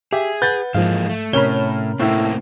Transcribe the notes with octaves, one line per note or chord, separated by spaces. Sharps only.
G4 G#4 E5
B4 F#5 G6 A6
G#2 E3 F3 G#3 A#3 F5
A3
A2 C3 C#4 A#4 C#5 B5 F6 G7
A2 A3 A#3 C4 E4